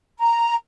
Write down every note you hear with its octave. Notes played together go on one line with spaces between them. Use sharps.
A#5